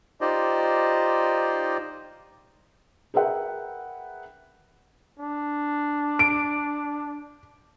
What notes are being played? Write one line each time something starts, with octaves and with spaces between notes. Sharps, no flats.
D#4 F4 G4 C5 D5 D#5
G#4 A#4 B4 E5 F#5 G5
D4
D7